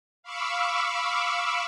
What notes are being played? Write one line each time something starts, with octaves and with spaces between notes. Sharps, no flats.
F5 B5 C#6 D6 E6